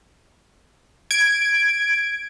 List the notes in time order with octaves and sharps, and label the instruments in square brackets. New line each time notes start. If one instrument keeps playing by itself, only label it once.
[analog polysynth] G#6 D7